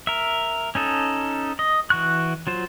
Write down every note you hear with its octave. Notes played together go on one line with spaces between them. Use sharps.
A#4 E5
C#4 D#4 A4
D#5
E3 F#4 C#6 F#6
F#3 F4 C5